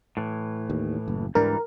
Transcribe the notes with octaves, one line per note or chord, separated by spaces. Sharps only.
A2 E3
D#2
F#1
D2 G#2 E3 G3 D4 A#4